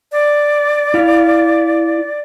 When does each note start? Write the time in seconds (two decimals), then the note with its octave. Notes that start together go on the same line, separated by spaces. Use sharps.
0.12 D5
0.94 E4 F5